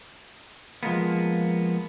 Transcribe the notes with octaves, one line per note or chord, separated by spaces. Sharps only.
F3 G#3 A#3 B3